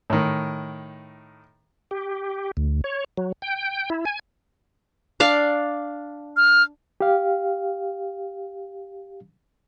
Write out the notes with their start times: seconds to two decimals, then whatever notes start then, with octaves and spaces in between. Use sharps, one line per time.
0.10 A2 D#3
1.91 G4
2.57 D2
2.84 C#5
3.17 F#3
3.42 G5
3.90 E4
4.05 G#5
5.20 D4 D5 F5
6.37 F6
7.01 G4 F5